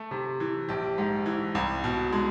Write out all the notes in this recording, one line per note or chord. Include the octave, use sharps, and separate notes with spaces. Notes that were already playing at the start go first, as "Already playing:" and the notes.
Already playing: A3
C3
E3
A#1 G4
G#2
E3
C2
B2
G#3